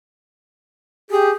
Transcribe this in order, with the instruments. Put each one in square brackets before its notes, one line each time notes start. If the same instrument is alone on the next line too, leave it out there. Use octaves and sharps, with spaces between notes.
[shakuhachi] G4 [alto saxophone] G#4